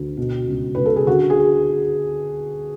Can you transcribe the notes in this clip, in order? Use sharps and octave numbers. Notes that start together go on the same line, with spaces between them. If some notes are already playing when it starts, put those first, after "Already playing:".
Already playing: D2
B2
C#2
C#2 B4
A4
G#4
D3 F#4
G#4